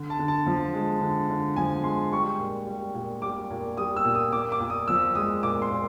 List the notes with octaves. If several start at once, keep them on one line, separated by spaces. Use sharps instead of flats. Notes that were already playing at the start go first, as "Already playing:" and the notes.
Already playing: D3
A5
D3
A5
F3
G#3
D3
D3
F3 G#5
G#3 C6
G3 C#6
A#2
G3
A#2
G3 D6
A#2
G3 D#6
E6
A#2
D#6
A#2 D6
D6
A#2
D#6
F3 E6
G#3 D#6
A#2 D6
C6
A#2